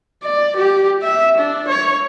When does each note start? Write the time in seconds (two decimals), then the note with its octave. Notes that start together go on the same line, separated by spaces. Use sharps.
0.23 D5
0.57 G4
1.03 E5
1.38 D4
1.68 C#5